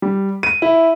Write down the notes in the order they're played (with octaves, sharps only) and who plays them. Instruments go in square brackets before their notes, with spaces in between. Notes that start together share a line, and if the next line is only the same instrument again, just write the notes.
[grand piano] G3
D#7
E4